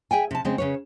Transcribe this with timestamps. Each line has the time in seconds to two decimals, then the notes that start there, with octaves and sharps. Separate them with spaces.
0.11 G#4 E5 G5 G#5
0.31 C3 A5
0.45 C#3 G#3 C4
0.58 C#3 B4 C#5